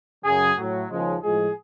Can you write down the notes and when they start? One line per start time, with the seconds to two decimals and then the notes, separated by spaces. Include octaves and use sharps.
0.25 F#2 C#3 F#3 G#4
0.57 A2 F#3
0.90 D#2 C#3 F3 G#3
1.22 A2 F3 G#3 G#4